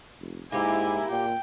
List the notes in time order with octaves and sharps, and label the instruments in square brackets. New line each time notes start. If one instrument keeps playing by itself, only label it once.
[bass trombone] F1
[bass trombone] G#2 [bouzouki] A#3 G4 [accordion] E4 [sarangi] G#5
[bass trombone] A#2 [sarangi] G5